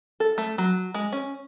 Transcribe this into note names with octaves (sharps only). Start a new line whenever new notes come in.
A4
A3
F#3
G#3
C#4